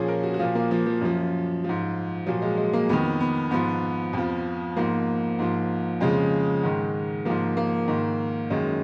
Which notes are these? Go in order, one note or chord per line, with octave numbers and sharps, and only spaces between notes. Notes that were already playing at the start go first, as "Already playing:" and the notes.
Already playing: A#2 F3 C#4 G#4
A#4
F#4
F#4
A#2 F3 F4
A#3
F3
F3
F#2 F3
G#2 F3
A#2 F3 F#3
G#3
G#3
A#3
F2 D#3 B3
B3
G#2 F3 B3
F2 F3
G#2 F3 A#3
G#2 F3
F2 C#3 F3 G#3
G#2 D#3
G#2 F3 A#3
A#3
G#2 D#3
F#2 D#3 G#3